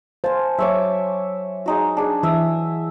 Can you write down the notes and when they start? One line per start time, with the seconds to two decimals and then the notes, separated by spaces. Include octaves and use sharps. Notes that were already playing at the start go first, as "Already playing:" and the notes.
0.24 C5 F5 G#5 A5
0.59 F#3 C#5 E5 C#6 D6
1.66 G#3 D#4 F#4
1.97 D4 G#4
2.23 E3 E5 D#6